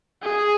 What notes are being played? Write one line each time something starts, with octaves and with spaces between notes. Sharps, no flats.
G#4